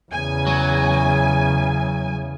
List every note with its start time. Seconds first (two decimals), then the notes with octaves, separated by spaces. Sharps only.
0.12 E2 C#3 G#5
0.47 F#3